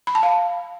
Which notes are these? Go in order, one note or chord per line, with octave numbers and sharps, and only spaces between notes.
B5
A5
F5